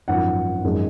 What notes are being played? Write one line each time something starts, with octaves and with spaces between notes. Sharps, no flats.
G#1 F#2 F3 F#5
G#1 F#2 F3 G#3